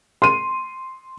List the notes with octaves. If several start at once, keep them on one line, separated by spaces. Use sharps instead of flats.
C6 D#7